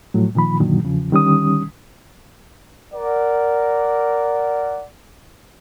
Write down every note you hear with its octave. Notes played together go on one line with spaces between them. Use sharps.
A2 F3 F#3
A#2 D#3 F3 B5
F#2 A#2 D3 D#3 F#3
E2 C#3 F3
D3 D#3 G3 C#4 D#6
A#4 D5 F#5